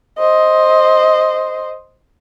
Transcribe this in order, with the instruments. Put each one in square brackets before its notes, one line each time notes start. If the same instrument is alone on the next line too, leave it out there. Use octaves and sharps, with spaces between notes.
[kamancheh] C5 D#5